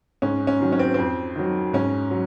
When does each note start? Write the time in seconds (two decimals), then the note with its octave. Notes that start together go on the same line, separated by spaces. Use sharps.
0.22 G#2 C#4
0.47 C#4
0.61 D#3 F#3
0.72 C#4
0.79 C4
0.94 F2 C4
1.36 D#3 F#3
1.73 G#2 C#4
2.11 F#3